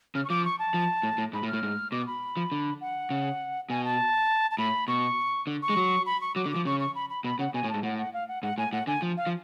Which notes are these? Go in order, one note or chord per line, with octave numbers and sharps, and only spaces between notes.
C#3 F6
C#6
F3 D6
C#6
A5
F3
A2
A2
G#2 B5
A2
F6
A2
G#2
B2 D6
B5
F3
D3
F#5
C#3
B2 G#5
A5
A5
A2 B5
B2 C#6
D3
C#6
G#3
F#3
B5
C#6
F#3 D6
D3
D6
F3
C#3 C#6
C#6
B5
B5
B2 B5
C#3 F#5
B2 G#5
A2
G#2 A5
A2 F#5
F#5
F5
F#5
G#2 F#5
A2 G#5
A2 F#5
D3 G#5
F3
F5
F3